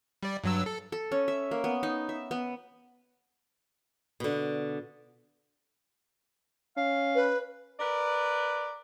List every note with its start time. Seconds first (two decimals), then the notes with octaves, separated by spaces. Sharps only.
0.23 G3 D5
0.44 G2 F#3 E6
0.66 A4
0.92 A4
1.12 C#4
1.28 E5
1.51 A#3
1.64 B3
1.83 D#4
2.09 E5
2.31 B3
4.20 B2 D3
6.77 C#4 F5
7.15 B4
7.80 A#4 B4 D5